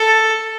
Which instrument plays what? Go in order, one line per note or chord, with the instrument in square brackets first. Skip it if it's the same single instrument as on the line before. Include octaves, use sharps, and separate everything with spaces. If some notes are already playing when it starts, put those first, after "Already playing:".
Already playing: [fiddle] A4